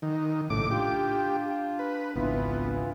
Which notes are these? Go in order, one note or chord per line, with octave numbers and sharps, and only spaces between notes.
D#3
A#1 A2 C#3 D6
D4 F4 G4
B4
G#1 C#2 E3 B3 D4 E4 F4